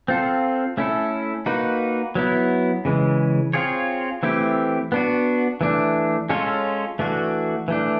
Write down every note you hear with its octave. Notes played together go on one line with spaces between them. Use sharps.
C4 F4 A4
A3 C#4 E4 A4
A#3 D#4 F#4 B4
F#3 B3 E4
C#3 E3 G#3
C4 F4 G#4 C#5
E3 A3 C4 E4 G4
B3 D4 F#4
E3 A3 D4
G#3 C#4 F4 A4 C#5
E3 A3 D4 F#4
E3 A3 D4